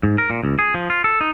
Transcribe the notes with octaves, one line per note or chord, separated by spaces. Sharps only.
G#2
A#4
A#2
C#2
G#4
F3
F4
A4
D#4